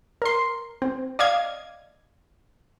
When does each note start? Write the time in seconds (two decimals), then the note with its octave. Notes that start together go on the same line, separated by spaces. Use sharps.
0.22 A#4 C6
0.82 C4
1.19 D5 D#5 F5 G#6